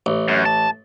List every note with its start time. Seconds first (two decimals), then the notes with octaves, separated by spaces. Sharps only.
0.06 A1
0.28 F#2
0.46 A5